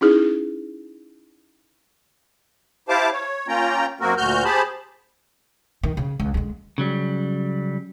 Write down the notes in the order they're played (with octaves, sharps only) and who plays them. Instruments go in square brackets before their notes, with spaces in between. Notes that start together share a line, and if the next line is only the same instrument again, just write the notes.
[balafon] C#4 D#4 E4 G#4
[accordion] E4 G4 C5 F5 A5 D6
C#5
A#3 C#4 F4 G5 A#5
F#2 A#3 C4 F#4 A#4
D2 A#2 F#4 F6 G6
G4 G#4 C5 A5 B5
[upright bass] D#3
C#3
C#2
D3 G#3
[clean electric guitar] C#3 F#3 G3